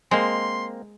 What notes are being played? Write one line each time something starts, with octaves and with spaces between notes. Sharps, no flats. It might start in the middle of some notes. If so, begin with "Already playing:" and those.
G#3 A#3 C4 C6